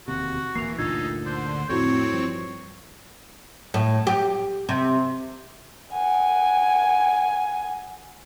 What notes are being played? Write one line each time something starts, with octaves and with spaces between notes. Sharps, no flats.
E1 D#2 C3 F#4
D#1 D#2 E3 A#3 C7 F7
G1 D2 A#2 D4 D#4 F4 A4 G#6
D3 C5
F2 A2 C4 E4 F#4 A4 C#5
G2 F3
A2
G4
C3
F#5 G#5